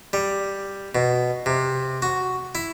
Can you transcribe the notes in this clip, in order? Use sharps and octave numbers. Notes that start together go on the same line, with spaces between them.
G3
B2
C3
F#4
E4